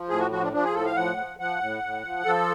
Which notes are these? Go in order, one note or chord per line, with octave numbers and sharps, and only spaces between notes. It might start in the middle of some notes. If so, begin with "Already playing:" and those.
Already playing: F3
A2 G#4
F#4
F3 F#4
D4
F3 D4
G#4
A2 A4
F5
F3 F#5
F3
F3 F#5
A2
A2
F3
F3 A4